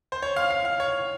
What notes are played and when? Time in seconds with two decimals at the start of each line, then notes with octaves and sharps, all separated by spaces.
0.12 C5
0.22 C#5
0.36 F5
0.51 F5
0.65 F5
0.80 C#5